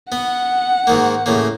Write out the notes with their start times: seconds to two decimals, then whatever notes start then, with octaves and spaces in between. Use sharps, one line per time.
0.12 B3 F#5
0.87 G#2 D#3 A#3
1.26 A2 C#3 A#3